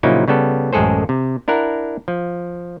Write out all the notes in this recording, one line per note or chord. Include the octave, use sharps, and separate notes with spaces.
A#2 C#3 F3 F#3 D#4 E4
C#3 G3 B3 A4
A1 F#2 G#3 G#4 A4 C5
C3
D4 E4 A#4 F#5 A#5
F3